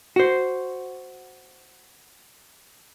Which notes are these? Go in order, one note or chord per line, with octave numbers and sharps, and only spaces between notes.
F#4 C5